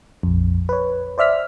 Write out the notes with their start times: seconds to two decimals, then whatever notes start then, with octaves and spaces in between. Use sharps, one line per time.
0.23 A#1 F2
0.69 B4 C#5
1.18 C5 D5 E5 F6 B6